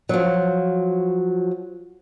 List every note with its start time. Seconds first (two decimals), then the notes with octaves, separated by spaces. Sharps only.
0.09 F3 F#3